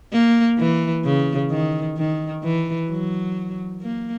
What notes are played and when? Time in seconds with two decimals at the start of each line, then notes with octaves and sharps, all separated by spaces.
0.12 A#3
0.58 E3
1.05 C#3
1.50 D#3
1.97 D#3
2.44 E3
2.90 F#3
3.82 A#3